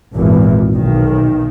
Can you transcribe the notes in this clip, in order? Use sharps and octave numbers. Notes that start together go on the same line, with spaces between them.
G#1 E2 A#2 E3
B1 D#3